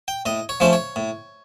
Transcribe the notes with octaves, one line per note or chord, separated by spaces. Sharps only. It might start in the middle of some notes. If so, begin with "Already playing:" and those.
G5
A2 D#5
C#5
F3 A3 C#4 C5
C#5
A2